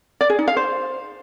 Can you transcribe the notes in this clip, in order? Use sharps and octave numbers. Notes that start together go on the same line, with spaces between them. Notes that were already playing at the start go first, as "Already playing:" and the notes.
D5
G#4
D#4
F5
C5